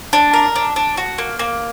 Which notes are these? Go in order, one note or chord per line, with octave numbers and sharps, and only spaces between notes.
D4
A#4
D4
D4
F#4
A#3
A#3